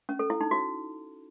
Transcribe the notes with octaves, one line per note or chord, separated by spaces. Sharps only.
C#4
A4
E4
D#4
F#4